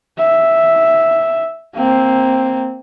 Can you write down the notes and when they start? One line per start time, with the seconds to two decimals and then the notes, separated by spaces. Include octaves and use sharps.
0.18 E5
1.76 A#3 C4